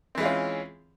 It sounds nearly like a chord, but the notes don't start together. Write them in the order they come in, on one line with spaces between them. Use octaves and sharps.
C4 E3 G#3 F4 C#4